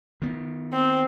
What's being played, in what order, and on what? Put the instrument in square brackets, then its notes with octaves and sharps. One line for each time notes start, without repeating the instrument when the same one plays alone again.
[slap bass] D#3 B3
[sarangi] C4